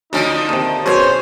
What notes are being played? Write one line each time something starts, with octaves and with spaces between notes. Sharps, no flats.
D2 D3 F3 C#4 D#4
D#2 C3
F#2 B2 G#4 C5 C#5